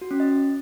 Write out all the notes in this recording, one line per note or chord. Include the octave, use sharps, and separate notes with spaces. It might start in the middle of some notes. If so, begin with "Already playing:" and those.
F#4
C#4
D#5